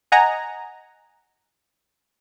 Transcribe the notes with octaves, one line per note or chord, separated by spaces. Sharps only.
D#5 F#5 G#5 A#5